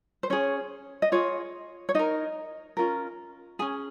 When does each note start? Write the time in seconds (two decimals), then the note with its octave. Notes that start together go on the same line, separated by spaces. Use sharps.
0.23 C5
0.30 C#4 G#4 C#5
1.02 D#5
1.12 F4 G#4 C#5
1.89 C#5
1.95 D#4 A#4 D#5
2.77 C#4 F4 A#4
3.59 C#4 G#4 G#5